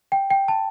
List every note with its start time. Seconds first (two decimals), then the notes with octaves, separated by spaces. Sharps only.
0.12 G5
0.31 G5
0.48 A5